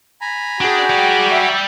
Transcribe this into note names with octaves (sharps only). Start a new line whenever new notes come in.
G#5 A#5 B5
D4 F#4 G#4 G5
G3 D5
E5 G5